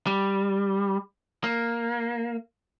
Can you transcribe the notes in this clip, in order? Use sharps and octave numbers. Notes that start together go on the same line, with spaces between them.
G3
A#3